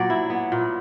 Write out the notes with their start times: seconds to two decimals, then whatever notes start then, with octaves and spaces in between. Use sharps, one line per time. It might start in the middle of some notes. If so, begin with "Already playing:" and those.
Already playing: A#2 F#3 B3 D5
0.10 E4
0.30 B3
0.52 A#2